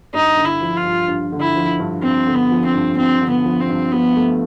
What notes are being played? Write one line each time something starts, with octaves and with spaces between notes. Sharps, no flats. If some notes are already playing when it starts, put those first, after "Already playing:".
G2 D#4
D3
E4
F3
F4
G2
G2
D3
E4
F3
G2
G2 C4
D3
B3
F3
C4
G2
G2 C4
D3
B3
F3
C4
G2
F3 B3
A3